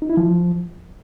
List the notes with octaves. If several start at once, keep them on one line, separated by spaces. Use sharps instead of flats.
D#4
E4
F3